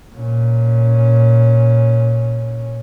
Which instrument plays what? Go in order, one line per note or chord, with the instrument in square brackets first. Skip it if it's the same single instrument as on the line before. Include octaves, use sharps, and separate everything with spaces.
[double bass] A#2 C#4